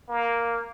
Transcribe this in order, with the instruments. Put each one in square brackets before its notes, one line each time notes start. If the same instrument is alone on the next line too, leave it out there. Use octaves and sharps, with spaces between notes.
[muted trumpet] A#3